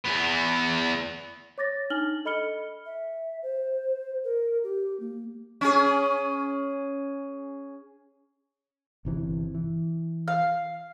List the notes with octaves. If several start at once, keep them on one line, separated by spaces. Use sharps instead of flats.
E2 B3
C#5 D6 A6 A#6
D4 D#4 G#5 F6 F#7 G7
A4 D#5 B5 F6 C#7 G7
E5
C5
A#4
G4
A#3
C#4 G#4
G1 C3 E3
E3
F5